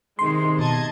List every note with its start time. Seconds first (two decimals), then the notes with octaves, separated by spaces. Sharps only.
0.19 C3 D#3 G#3 C6
0.59 B2 D#5 A5 G#6